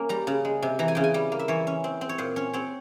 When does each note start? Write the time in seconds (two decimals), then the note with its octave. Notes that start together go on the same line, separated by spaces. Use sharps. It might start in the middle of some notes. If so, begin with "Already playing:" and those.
Already playing: A#3 C#4
0.09 G3 A#5
0.27 C#3
0.45 G#3
0.62 C3
0.79 E3 A#5
0.88 G#5
0.95 C#3 G5
1.04 G#5
1.14 G3
1.32 A#3
1.39 E5
1.48 E3 C#5
1.67 C#4
1.84 C4
2.01 C4
2.09 C#5
2.18 A#2 C5
2.36 C#4 C#5
2.53 C4 C#5